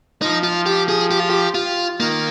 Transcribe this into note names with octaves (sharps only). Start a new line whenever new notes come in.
F3 D#4
F4
G4
G#4
G4
F4
G4
F4
D#3 A#3